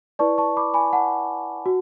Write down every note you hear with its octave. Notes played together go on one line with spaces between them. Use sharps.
E4 B4 D5 A5 C#6
A5 C#6
B5 D6
G#5 B5
F#5 A5
F#4